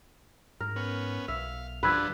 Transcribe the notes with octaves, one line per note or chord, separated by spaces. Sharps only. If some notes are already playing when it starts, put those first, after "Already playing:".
G#2 A#4
B3 C#4
B1 E5 F5
G2 D3 F3 B4 B5 E6 G#6